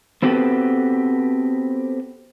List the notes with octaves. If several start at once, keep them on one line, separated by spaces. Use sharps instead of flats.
B3 C4 F#4 G4 A4 B4